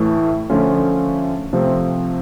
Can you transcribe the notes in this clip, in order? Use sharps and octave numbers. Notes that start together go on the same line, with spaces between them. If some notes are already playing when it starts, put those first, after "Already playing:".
Already playing: A2 E3 A3
D3 F3 A3 C#4 F4
C3 F3 A3 C4